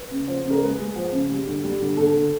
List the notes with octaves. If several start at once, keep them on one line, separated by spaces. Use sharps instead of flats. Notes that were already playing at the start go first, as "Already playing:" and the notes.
Already playing: B4
C#3
F3 C5
C#3
A#4
G#3 B4
G#3
F3
C#3
G3
D3
G3
D3
D3 A4
D3